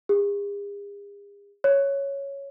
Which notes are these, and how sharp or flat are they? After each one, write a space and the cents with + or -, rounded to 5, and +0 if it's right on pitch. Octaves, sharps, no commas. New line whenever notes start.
G#4 -45
C#5 +0